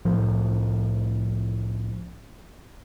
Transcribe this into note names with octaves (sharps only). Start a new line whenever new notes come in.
C2 A2 F3